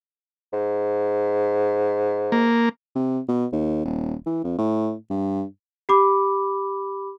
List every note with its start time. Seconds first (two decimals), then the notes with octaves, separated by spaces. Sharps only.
0.53 G#2
2.32 A#3
2.95 C3
3.29 B2
3.53 D#2
3.85 D#1
4.26 E3
4.44 F2
4.58 A2
5.10 G2
5.89 G4 B5 D6